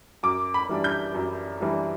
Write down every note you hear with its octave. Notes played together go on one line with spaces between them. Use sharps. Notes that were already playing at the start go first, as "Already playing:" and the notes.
F#2 D6
B5
E3 G3 D4
G6
F#2
E3 G3 D4